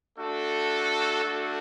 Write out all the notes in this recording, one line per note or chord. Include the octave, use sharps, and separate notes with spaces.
A3 D4 F#4 A4
A3 D4 F#4